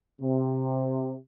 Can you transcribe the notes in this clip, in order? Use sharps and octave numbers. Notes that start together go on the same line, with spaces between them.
C3